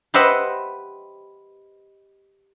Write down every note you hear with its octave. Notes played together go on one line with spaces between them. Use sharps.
G4 B4 C5 D#5 E5 F#5